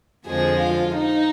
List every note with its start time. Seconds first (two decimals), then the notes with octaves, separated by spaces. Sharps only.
0.24 F2 D3 F3 G#3 G#4
0.59 F4
0.94 D#4